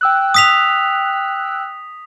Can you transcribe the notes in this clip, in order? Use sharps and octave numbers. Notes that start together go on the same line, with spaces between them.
G5 E6 F#6
D#6 B6 F7